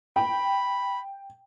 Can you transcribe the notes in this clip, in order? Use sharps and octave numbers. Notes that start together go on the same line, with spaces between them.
G5 B5